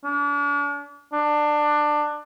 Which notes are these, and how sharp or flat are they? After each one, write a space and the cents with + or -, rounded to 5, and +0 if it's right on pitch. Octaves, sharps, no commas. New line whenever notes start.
D4 -40
D4 +20